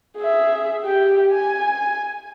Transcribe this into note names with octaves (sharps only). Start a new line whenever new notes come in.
G#4 E5
G4 G5
G#5